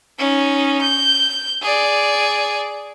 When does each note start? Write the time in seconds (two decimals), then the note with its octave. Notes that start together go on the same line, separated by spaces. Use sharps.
0.18 C#4 D#4
0.82 G6
1.62 G#4 D5